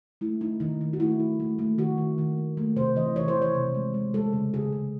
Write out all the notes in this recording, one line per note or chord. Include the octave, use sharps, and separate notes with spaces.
A3 E4
A3 D#4
D#3 D#4
D#3
F#4
A3 E4
A3
A3
A3
D#3 F#4
D#3
D#3
A3
A3
C3 C5
E3 D#5
E3 C#5
C5
E3
C#5
C3
G#3
G#3
G#3 A4
C#3
C#3 G#4
C#3